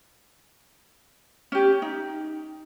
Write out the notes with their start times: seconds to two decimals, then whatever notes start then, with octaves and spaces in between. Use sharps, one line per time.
1.52 C#4 G4
1.82 D#4